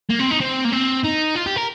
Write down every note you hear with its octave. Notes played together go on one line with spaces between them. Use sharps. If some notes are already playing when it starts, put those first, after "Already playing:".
A#3
C4
D#4
C4
A#3
C4
D#4
F4
G4
A#4